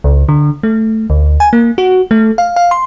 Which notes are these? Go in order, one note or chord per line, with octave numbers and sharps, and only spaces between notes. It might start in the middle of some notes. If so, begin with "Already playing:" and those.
C#2
D3
A3
D2
G#5
A#3
F#4
A3
F5
F5
C6